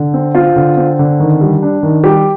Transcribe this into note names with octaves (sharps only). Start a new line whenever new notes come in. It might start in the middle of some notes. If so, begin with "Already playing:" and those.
Already playing: D3
C4
C4 F4
D3
C4
D3
D#3
G3
D4
D#3
G3 G4